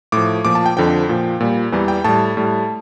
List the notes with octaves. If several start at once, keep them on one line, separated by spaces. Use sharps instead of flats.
A2 F3 D6
A#2 F3 D6
A5
G5
F2 D3 F3 G5
A#2 F3
A#2 G3
E2 E3 G3
G5
A2 G3 A5
A2 G3